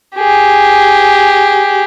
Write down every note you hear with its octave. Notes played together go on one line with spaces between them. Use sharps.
G4 G#4